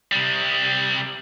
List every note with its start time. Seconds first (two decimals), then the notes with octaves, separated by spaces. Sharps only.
0.12 C3 G3